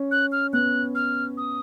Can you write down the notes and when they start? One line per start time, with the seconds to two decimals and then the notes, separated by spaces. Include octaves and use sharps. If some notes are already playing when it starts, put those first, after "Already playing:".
Already playing: C#4
0.11 F#6
0.32 F6
0.53 B3 F#6
0.95 F6
1.37 D#6